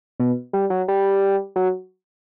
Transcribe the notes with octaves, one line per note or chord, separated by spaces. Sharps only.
B2
G3
F#3
G3
F#3